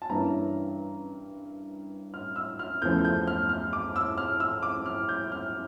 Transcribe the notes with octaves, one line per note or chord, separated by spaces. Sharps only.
A5
G2 E3 A#3 C#4 A#5
F6
E6
F6
E2 C#3 F3 A3 G6
G6
F6
F6
D6
E6
F6
E6
D6
F6
G6
F6